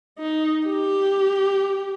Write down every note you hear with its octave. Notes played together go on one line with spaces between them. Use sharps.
D#4
G4